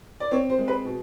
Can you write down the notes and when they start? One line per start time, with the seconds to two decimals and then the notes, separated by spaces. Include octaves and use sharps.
0.20 D5
0.31 C4 C#5
0.50 C5
0.59 G#3
0.68 B4
0.85 B2